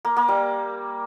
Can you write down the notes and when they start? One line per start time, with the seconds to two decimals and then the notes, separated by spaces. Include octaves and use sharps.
0.05 A#3
0.16 A#3
0.28 G3